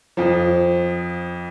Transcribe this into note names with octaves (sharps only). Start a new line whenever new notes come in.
F2 F3